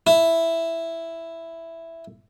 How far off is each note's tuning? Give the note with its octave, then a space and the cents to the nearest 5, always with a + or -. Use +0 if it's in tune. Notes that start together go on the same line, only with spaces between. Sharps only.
E4 +5